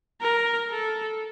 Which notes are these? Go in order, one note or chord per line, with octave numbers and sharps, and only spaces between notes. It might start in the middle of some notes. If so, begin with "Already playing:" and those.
A#4
A4